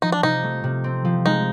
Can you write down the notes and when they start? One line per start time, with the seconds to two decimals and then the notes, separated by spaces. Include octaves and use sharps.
0.02 F3 D#4
0.12 D4
0.23 C3 D#4
0.43 A3
0.64 C3
0.84 C4
1.05 F3
1.26 G#3 D#4